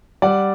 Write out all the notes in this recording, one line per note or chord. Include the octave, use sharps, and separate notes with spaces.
G3 D5 F#5